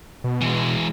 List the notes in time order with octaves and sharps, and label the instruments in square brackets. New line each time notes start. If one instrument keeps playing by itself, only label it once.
[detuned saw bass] B2
[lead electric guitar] E3 G#3